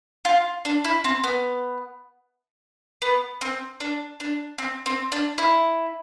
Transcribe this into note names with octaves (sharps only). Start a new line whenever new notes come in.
F4
D4
E4
C4
B3
B3
C4
D4
D4
C4
C4
D4
E4